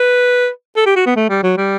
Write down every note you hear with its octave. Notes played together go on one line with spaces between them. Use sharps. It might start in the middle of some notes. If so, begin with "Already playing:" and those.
Already playing: B4
A4
G4
F#4
B3
A3
G3
F#3
G3